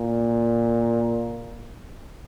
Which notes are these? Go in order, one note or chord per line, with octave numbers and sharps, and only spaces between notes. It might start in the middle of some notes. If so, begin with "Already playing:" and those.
Already playing: A#2